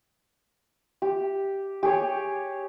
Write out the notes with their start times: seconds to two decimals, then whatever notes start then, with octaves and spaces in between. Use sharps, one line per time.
1.02 G4
1.83 G4 G#4 C#5